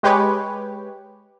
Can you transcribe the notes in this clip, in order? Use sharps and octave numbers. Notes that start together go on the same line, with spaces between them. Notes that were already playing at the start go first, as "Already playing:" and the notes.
G#3 G4 B4 C#5